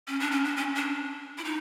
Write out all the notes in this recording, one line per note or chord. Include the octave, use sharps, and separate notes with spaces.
C#4
D4
C#4
D4
C#4
D4
E4
D#4